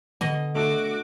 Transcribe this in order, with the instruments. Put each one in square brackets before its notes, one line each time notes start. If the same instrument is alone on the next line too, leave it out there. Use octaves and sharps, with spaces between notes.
[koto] B2 D#5 [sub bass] D3
[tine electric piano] A3 D4 A4 [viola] F#4 D6